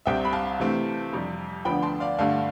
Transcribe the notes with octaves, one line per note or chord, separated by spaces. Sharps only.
C2 C3 G3 C4 E5 G5
B5
F5 A5
C3 E3 A3 C4
F2 C3 G3
D2 D3 F3 B3 D4 G5 B5
A5 C6
D5 F5
G2 D3 A3 F5 A5